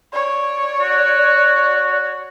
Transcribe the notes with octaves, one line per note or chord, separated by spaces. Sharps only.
C#5 D5
F#4